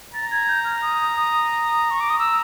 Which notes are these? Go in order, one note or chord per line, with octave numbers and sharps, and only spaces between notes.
A#5 A6
G#6
G6
F6
D#6
D#6
C#6
D6
D#6
E6